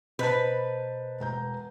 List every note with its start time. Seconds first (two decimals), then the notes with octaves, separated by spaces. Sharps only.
0.19 B2 B4 C5 D#5 A5 A#5 F#6 G6
1.20 E1 A#5 G6